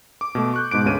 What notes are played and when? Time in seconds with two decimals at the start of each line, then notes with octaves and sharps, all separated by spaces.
0.21 D6
0.35 B2 A3
0.54 C#6 F#6 G6
0.71 G#2 B2 D6 D7
0.86 D2 C#3 B4 D#7